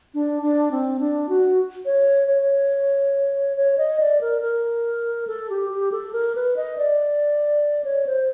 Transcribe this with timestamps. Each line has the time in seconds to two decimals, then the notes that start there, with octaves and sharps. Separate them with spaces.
0.14 D4
0.42 D4
0.71 C4
1.00 D4
1.29 F#4
1.85 C#5
2.28 C#5
3.57 C#5
3.78 D#5
4.00 D5
4.21 A#4
4.42 A#4
5.27 A4
5.50 G4
5.70 G4
5.92 A4
6.13 A#4
6.35 B4
6.56 D#5
6.78 D5
7.84 C#5
8.07 C5